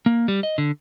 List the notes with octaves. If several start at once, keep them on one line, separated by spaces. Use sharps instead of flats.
A#3
G3
D#5
D3